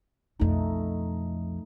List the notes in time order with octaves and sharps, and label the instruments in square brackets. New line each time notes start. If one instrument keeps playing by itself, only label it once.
[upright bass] B1 F2 [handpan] A3 D#4